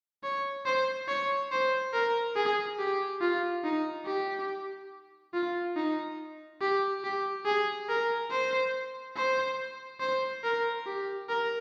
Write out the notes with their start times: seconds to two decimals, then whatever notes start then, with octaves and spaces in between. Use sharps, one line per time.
0.23 C#5
0.65 C5
1.08 C#5
1.52 C5
1.93 A#4
2.36 G#4
2.79 G4
3.21 F4
3.64 D#4
4.05 G4
5.34 F4
5.76 D#4
6.61 G4
7.04 G4
7.46 G#4
7.88 A#4
8.30 C5
9.16 C5
10.00 C5
10.44 A#4
10.86 G4
11.29 A#4